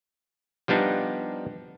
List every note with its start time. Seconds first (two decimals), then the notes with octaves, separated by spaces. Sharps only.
0.68 F3 G3 B3 D4 D#4